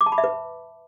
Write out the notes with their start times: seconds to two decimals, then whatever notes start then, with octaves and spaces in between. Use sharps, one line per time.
0.01 D6
0.06 A5
0.12 B5
0.18 E5
0.24 B4